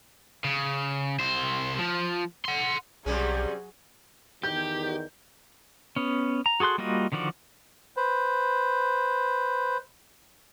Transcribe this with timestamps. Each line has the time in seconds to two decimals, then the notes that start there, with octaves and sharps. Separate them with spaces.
0.44 C#3
1.20 C2 C5
1.79 F3
2.45 F#5 C6
3.06 B1 C3 F#3 G3 C#4 G#4
4.43 E2 D#3 G4 G6
5.96 B3 C#4
6.46 A#5
6.60 F#4 G#4 A4 C6 F#6
6.78 G3 A#3 F4 F#4 D#5
7.12 D3 D#3 F3 F#4 D5
7.97 B4 C5